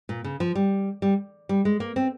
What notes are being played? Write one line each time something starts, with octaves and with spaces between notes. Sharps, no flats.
A#2
C#3
F3
G3
G3
G3
G#3
A#3
C4